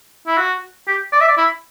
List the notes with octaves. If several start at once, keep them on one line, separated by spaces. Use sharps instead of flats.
E4
F#4
G4
D5
E5
D5
E4